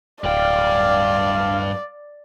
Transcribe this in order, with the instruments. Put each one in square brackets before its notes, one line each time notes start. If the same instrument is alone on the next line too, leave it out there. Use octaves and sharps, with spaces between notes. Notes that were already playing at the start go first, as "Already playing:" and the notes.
[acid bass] D1 [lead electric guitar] G2 G5 [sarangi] D5 [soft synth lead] F5